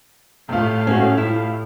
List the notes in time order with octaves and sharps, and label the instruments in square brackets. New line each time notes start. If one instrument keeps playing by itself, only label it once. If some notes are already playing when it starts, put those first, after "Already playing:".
[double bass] A2 [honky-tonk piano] C3 F4 [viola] A3 F5
[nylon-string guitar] C#4 F#4
E4